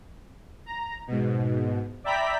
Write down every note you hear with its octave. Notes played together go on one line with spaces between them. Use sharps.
A#5
G#2 B2
D5 E5 G5 A#5 B5 B6